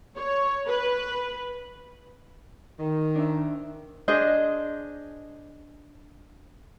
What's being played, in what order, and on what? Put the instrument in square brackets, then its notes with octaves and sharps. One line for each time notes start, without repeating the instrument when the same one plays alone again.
[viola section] C#5
B4
[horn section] D#3
[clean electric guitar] D4 C5 E5
[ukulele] D4 G#4 C5 D#5